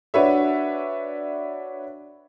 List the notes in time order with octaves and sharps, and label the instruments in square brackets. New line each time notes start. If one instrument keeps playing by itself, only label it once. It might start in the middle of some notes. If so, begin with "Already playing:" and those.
[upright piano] D4 F#4 B4 C#5 E5